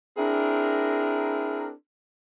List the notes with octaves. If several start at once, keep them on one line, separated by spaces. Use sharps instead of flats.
C4 D4 E4 G#4 A#4